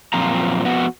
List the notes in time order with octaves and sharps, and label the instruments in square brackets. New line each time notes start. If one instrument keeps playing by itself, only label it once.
[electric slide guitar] F#2 A#2 F3 C4 F4 A#5
F2 B3 F#4